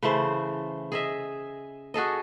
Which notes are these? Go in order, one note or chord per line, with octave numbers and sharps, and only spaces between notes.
C#3 E3 A3 C5
G#4 D#5 E5
F#4 G#4 A4 D#5